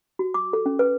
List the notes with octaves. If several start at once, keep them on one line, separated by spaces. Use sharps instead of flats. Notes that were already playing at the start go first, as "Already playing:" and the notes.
F#4
D6
A4
C#4
B4